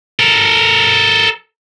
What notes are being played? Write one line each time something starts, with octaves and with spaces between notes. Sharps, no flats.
A4 A#4